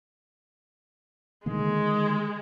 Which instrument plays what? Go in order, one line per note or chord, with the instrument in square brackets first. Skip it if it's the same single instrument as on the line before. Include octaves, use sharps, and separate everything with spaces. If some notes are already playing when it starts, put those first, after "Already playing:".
[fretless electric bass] D3 D#3 A#3 [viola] G#3